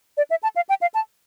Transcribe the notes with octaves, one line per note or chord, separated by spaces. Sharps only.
D5
E5
A5
F5
G5
F5
A5